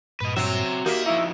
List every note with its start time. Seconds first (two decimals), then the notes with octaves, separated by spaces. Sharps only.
0.20 G2 A#2 B4 D#5
0.36 F#3 C4 E5
0.86 A#3 D#4 F#4 G4 A#4 E5
1.06 F3 D#4 E4 F5 C#6 E6